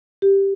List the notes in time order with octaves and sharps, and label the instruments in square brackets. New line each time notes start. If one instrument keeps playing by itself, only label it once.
[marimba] G4